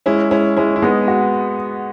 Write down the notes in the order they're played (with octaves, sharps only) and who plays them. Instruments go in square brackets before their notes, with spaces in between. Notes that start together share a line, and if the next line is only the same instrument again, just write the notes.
[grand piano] G#3 [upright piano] C#4 E4
[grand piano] G#3 [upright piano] C#4 E4
[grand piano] G#3 [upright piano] C#4 E4
[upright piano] E4
[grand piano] G#3 [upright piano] B3 D#4
[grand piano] F#4